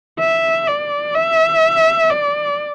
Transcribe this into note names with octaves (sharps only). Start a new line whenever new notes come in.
E5
D5
E5
D5